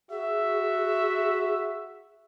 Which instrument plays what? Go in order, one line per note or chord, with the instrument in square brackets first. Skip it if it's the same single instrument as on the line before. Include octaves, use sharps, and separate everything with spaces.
[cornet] F#4 [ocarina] G#4 [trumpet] E5